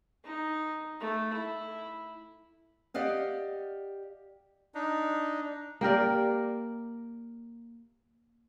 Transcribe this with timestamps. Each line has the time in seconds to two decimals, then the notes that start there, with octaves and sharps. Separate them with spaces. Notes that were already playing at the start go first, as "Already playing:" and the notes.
0.24 D#4
1.00 A3
1.34 E4
2.94 G4 D5 D#5 F5 F#5
4.75 D4 D#4
5.81 A#3 G4 A#4 D5